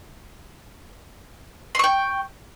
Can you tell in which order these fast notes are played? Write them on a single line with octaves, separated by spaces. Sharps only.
C6 C#6 G5